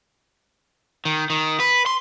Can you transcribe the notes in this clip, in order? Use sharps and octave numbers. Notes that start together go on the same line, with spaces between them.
D#3
D#3
B4
C6